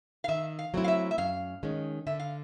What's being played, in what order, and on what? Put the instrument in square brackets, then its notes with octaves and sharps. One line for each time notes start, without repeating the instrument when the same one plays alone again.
[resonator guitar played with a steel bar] F5
[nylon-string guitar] D#3 [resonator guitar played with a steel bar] E5
[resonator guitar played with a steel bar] F5
[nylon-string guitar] F#3 A3 C4 E4
[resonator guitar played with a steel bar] F5
E5
E5
[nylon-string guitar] F#2 [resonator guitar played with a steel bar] F5
[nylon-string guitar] D#3 G#3 C#4
[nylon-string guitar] D3 [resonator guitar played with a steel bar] E5
[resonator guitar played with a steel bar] F5